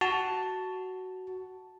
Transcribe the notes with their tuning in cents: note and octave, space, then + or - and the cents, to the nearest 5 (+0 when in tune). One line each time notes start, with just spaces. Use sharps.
F#4 +10 A5 +0